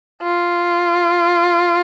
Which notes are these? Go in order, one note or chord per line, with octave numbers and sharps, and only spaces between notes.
F4